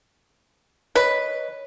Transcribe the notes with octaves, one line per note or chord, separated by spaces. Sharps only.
B4 C#5 D#5